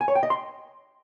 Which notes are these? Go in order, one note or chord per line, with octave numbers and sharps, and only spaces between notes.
G#5
C#5
G5
D#5
C6